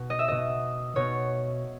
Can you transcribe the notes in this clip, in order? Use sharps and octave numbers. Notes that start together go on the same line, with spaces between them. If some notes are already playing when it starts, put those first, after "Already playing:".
Already playing: B2
D#5
E5
B2 D#5
B2 C#5